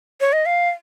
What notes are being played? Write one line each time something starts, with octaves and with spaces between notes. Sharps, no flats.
C#5
D#5
F5